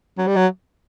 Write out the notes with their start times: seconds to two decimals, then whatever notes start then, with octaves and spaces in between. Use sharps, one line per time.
0.18 F#3
0.27 G3
0.36 F#3